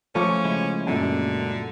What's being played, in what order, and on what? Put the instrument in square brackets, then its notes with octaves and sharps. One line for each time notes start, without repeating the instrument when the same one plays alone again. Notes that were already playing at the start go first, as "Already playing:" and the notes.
[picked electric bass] F3 A3 [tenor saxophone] C#4 [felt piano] C5 C#6 D6
[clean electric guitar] C#3 G#3 E4
[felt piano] F#2 A#2 [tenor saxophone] D3